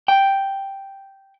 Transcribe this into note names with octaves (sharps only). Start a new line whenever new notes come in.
G5